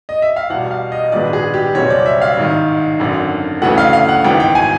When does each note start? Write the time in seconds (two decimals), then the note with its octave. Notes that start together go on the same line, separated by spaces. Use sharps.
0.09 D#5
0.22 E5
0.36 F5
0.50 E2 B2 G3 F#5
0.71 F5
0.92 D#5
1.12 A#1 G#2 D#3 G#3 B3 D5
1.33 G#4
1.54 G4
1.75 F#1 E2 B2 G3 C4 C#5
1.90 D5
2.06 E5
2.22 F5
2.37 A1 G#2 D#3
2.99 G#1 F#2 D3
3.62 D2 C#3 E3 A3 F#5
3.78 F5
3.93 F5
4.09 F#5
4.24 G#1 G#2 E3 G5
4.40 G5
4.55 G#5